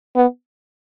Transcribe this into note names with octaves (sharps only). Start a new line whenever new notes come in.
B3